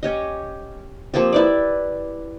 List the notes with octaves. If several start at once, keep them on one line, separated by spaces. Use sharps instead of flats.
C#4 G4 D#5
F3 A#3 C4 G4
E4 B4 D5